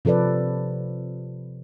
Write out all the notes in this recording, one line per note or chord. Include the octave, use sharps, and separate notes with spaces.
C3 F3 A4 B4 D5